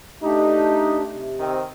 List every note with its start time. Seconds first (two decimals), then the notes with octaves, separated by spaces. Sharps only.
0.23 A3 D4 D#4 G4
1.07 C3
1.40 D#3 C4